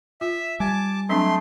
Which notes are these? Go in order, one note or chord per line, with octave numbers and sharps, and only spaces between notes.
F4 E5
G3 G#5 A5 D6
F#3 A3 C4 D4 D#4 E5 A5 C6